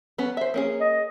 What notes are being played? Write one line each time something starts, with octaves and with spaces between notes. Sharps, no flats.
B3 C#4
C5 E5
A#3 C#4 G#4
D#5